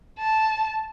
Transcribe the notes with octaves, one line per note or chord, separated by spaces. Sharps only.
A5